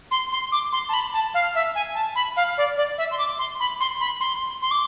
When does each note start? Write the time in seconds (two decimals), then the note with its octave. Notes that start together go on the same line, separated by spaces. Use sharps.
0.11 C6
0.32 C6
0.52 D6
0.72 C6
0.89 A5
0.94 B5
1.14 A5
1.34 F5
1.55 E5
1.75 G#5
1.95 A5
2.15 B5
2.37 F5
2.58 D5
2.77 D5
2.98 E5
3.11 C6
3.18 D6
3.39 C6
3.60 B5
3.81 C6
4.01 B5
4.21 C6
4.62 C6
4.71 D6